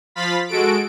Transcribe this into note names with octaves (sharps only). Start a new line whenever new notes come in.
F3 F4 F5 B5 A6 B6
G#3 F#4 A4 D7